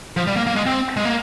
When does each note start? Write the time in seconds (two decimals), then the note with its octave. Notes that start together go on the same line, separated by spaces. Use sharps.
0.17 F3
0.27 G3
0.36 A#3
0.47 A#3
0.56 G#3
0.66 C4
0.97 G#3
1.05 A#3